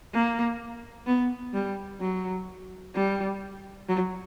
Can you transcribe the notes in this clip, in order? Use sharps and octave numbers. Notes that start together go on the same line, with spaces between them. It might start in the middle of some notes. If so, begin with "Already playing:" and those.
A#3
B3
G3
F#3
G3
F#3